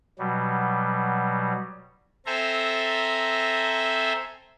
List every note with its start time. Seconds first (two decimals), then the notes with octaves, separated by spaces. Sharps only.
0.19 B2 F#3 G3
2.26 C4 A4 C5 E5 G#5 A#5